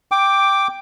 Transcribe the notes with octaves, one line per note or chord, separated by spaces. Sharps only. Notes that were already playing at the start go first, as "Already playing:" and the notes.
G5 D6